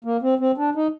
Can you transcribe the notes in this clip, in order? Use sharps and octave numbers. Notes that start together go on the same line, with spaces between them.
A#3
C4
C4
D4
D#4